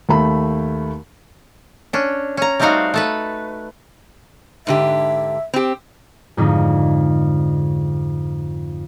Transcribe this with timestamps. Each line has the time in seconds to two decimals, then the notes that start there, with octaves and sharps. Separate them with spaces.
0.09 D#2 A3 B5
1.93 C#4 D4
2.37 C#4 A#5
2.60 G3 A3 C4 D#4 F#4 F5
2.94 A3 A4 B4
4.67 G#2 D3 G4 E5
5.54 C4 G4
6.37 F2 G#2 D3 D#4